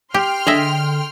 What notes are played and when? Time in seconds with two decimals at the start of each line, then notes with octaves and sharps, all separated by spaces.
0.14 G4 G5 C6 F6
0.47 D3 G#4 D#5 E5